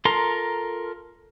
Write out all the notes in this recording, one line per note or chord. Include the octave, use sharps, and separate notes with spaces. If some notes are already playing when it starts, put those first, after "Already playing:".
F4 A4 A#4 A#5 C6